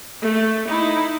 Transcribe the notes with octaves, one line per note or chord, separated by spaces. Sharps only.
A3
D#4 E4